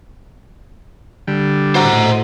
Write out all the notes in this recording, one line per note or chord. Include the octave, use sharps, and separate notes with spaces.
D3 G3
A2 A3 F#4 C5 D#5 A#5